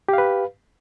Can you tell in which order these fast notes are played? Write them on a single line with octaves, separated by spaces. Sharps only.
G4 F5 B4